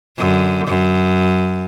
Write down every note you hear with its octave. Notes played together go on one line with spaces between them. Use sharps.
F#2 D3
F#2